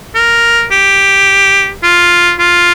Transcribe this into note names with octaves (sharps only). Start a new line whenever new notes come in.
A#4
G4
F4
F4